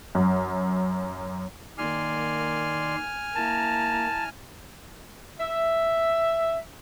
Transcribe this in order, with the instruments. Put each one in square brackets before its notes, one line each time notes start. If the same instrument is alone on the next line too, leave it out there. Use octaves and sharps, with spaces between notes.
[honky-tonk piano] F#2
[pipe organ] D#3 D5 C6 [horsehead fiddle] A#3 [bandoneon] G#5 F6
[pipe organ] A#3 [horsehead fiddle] E4 A#5 [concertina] A5
[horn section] E5